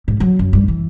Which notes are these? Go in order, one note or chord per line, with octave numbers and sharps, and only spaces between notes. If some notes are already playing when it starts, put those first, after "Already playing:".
G#2
F#3
F#2
G2
E3